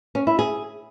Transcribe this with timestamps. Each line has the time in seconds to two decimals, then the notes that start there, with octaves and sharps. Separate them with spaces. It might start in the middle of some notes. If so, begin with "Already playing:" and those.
0.15 C#4
0.27 E4
0.39 G#4